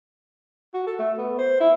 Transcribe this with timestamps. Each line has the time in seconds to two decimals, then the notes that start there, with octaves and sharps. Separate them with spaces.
0.74 F#4
0.87 A4
0.99 A3
1.18 B3
1.39 C5
1.60 E4